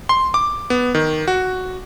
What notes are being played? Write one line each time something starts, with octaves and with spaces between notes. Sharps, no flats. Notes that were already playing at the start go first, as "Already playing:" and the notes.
C6
D6
B3
D#3
F#4